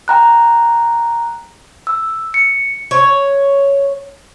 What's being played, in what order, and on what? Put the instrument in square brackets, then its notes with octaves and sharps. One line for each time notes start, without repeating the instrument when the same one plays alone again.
[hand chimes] G5 A#5 F#6
E6
C#7
[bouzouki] C#5